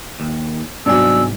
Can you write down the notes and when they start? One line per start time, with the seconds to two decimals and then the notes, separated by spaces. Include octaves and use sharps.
0.20 D#2
0.86 C2 G#2 F#3 B3 D4 G#5 E6